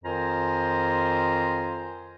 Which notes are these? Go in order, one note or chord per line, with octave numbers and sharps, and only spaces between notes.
F2 D#3 F4 C5 G#5 A#5